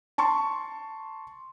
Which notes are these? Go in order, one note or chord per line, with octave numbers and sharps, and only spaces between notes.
A5 C6 C#6